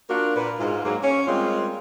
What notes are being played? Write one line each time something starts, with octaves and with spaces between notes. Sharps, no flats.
A#3 D4 F4 F#4 A#4
A#2 B4
G#2 F4
G#2 F#3 A#3
C#4
G3 G#3 A#3 C4 F4